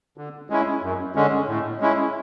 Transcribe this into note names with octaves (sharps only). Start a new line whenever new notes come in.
D3
G#3 C#4 E4
F#2
D3 G#3 C#4
A2
G#3 C#4 E4